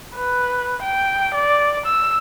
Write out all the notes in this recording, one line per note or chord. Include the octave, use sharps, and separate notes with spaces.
B4
G5
D5
E6